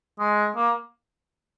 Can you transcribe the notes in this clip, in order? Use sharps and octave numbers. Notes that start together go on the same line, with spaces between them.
G#3
A#3